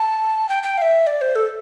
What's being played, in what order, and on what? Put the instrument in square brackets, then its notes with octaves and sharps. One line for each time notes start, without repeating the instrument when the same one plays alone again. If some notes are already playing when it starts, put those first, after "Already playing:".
Already playing: [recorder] A5
G5
G5
F5
E5
D5
C5
A4